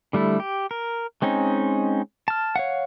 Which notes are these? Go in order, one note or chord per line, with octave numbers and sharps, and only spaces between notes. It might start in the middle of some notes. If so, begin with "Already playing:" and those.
D3 G3 A3 E4
G4
A#4
G#3 C4 C#4 D#4
A5 F6
C#5 F5 F#5